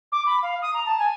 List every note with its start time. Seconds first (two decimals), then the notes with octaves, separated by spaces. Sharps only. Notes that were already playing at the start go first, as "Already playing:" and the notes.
0.12 D6
0.26 B5
0.42 F5
0.62 D#6
0.73 A#5
0.85 A5
0.98 G#5